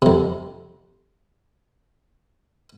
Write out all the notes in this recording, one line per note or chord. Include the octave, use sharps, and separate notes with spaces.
F2 C3